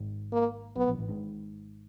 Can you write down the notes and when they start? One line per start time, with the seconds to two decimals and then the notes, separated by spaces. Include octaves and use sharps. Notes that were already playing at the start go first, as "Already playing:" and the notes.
Already playing: G#1 G#2
0.33 A#3
0.76 B1 B2 B3
0.88 A#1 A#2
0.98 A1 A2
1.09 G#1 G#2